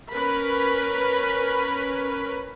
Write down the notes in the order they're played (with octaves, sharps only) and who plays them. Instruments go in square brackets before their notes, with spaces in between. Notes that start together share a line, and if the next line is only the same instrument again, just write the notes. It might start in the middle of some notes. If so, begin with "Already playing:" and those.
[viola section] C#4 A#4 B4 B5